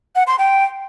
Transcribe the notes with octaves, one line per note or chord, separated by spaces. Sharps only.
F#5
C6
G5